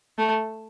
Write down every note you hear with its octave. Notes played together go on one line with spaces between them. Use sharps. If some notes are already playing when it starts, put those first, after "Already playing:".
A3